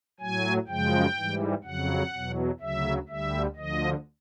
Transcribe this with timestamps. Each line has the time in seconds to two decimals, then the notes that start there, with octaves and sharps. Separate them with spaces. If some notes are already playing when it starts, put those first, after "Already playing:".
0.20 A2 F#3 G#5
0.67 F#2 C#3 F3 G#3 G5
1.16 G#2 E3 G3
1.64 F2 C#3 F#3 F#5
2.12 E2 B2 F#3
2.60 D2 C#3 F#3 E5
3.08 D2 D3 G3 E5
3.56 D2 D3 F3 D#5